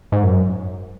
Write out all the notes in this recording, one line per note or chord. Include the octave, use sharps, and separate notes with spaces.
G#2
F#2